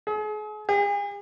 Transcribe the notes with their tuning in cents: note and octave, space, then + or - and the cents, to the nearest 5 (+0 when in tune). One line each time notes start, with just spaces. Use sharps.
G#4 +40
G#4 -40